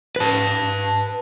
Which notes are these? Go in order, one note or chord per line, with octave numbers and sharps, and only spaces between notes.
B4 A5